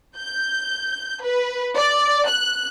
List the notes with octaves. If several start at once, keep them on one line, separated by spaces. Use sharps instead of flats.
G6
B4
D5
F#6